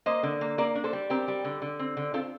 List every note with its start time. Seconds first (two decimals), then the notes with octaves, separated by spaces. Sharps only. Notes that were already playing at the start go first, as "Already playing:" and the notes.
0.06 A#3 C5 D#5
0.23 D3
0.41 A#3
0.58 A#3 A#4 D5
0.75 D4
0.84 A4 C5
0.93 G3
1.10 C4 G4 A#4
1.28 G3
1.44 D3
1.62 D3
1.79 C4
1.97 D3
2.14 C4 F4 A4